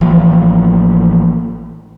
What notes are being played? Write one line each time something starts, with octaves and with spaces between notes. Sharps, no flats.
A1 E3 F3 A#3